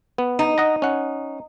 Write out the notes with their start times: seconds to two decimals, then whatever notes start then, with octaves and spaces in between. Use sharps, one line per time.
0.18 B3
0.39 D#4
0.58 D#5 F#5 A#5
0.82 C#4 F#5